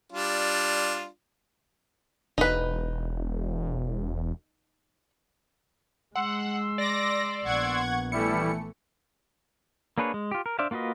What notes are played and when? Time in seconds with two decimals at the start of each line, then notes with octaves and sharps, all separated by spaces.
0.13 G3 D4 F4
2.38 E1 D#4 B4
6.16 G#3 F#5 C6 E6
6.78 D5 D6 A#6
7.44 A#1 B3 F#5 C#6 G#6
8.12 E3 G3 A3 E4 C#7
9.98 A#3 D4 G#4 B4 C#5
10.14 G#3
10.31 F4 G4
10.46 A#4
10.59 D4 C5 D5 E5 F5
10.71 A#3 F4 F#4 B4 D#5